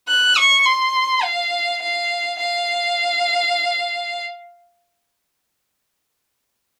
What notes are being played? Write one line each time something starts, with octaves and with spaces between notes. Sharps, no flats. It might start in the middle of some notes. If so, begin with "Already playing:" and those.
F#6
C#6
C6
F5
F5
F5